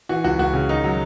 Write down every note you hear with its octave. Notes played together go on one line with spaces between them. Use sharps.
E3 F#4
C#2 F#4
C#2 F#4
C#3
D#3 D#4
F#3